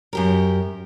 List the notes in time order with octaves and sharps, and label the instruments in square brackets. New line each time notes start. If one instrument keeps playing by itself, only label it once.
[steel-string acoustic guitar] F#2 G4 A#4